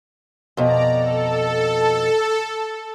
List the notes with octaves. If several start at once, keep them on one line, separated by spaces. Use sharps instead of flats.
F2 B2 D5 A#5
A4